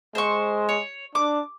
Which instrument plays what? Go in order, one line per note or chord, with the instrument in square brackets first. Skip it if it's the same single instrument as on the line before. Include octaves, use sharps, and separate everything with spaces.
[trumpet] G#3 [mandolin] C5 C#6
[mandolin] C#5
[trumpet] D4 [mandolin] D6